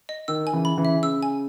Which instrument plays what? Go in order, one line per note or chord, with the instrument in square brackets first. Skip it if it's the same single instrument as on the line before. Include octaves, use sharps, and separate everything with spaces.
[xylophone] D#5
[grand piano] D#3 [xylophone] E6
[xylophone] G#5
[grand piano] C#3 E3
[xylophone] B5
[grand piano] C#3 E3
[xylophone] E5
[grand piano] C#3 [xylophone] E6
[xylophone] G#5